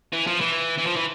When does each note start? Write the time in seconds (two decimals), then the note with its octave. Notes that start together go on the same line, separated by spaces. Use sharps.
0.13 E3
0.27 F3
0.41 E3
0.79 E3
0.87 F3
0.97 E3